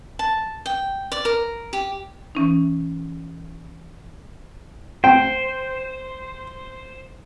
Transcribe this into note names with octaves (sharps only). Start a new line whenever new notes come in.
A5
G5
D5
A#4
G4
E3 C#4 D#4
C5 G5